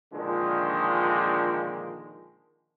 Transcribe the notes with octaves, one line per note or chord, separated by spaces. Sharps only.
A#2 D3 D#3 F3 G#3 D4